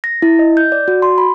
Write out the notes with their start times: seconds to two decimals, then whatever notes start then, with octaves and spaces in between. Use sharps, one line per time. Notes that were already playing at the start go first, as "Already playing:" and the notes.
0.04 A#6
0.22 E4
0.39 D#5
0.57 G6
0.72 D5
0.88 F#4
1.02 C6
1.18 B5